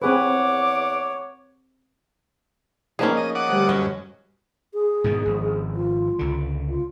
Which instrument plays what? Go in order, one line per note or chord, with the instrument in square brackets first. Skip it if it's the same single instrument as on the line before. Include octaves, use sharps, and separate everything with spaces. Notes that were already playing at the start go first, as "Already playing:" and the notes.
[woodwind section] E2 F#5 D6 [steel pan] C4 G#4 B4 [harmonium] C#5
[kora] F3 A#3 [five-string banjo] C#4 D#4 G#4
[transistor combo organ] D#5
D5 F#5 D#6
[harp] D2 G3
[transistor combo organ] F#2 [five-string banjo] C#4 [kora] D#5
[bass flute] G#4
[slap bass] G#2 B2 D#3
G#1 F3
[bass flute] F4
[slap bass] C#2 D3
[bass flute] F4